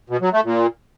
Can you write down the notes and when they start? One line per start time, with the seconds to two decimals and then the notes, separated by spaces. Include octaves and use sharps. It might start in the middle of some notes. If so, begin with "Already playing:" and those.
0.10 B2
0.21 F#3
0.33 A3
0.44 A#2